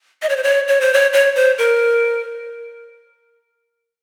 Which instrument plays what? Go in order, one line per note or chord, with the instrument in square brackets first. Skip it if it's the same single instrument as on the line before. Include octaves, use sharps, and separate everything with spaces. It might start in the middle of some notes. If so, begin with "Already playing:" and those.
[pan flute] D#5
C#5
C5
C#5
C#5
C5
C#5
C#5
C5
A#4